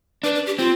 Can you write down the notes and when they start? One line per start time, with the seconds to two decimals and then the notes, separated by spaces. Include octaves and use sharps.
0.23 D4 B4
0.35 B4
0.46 G4
0.58 C4 F4